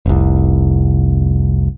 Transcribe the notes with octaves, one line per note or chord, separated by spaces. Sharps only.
F1 C2